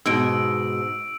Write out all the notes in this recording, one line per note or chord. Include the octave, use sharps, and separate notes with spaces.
G#2 B2 D#5 E6 D7